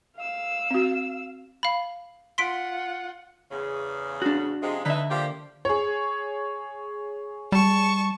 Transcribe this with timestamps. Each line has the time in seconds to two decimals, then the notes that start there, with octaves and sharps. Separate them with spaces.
0.16 F5 E6
0.71 C4 F#4
1.63 F5 B5
2.38 F4 F#5 C6 B6 D7
3.52 E2 C#3
4.22 D4 F#4
4.62 C3 F3 G#3
4.86 D3 D#4 B4 E5
5.11 F3 A#3 G4
5.65 G#4 C#5
7.52 G3 A5 C#6